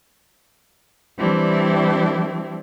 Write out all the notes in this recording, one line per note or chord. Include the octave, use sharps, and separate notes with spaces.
E3 G3 C4 D4 E4